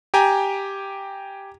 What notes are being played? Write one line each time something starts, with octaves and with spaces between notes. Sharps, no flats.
G4 G5 G#5 A#5